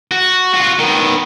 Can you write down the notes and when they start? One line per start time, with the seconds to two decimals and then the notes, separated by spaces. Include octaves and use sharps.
0.11 F#4
0.54 F4 F#4
0.79 D#3 B3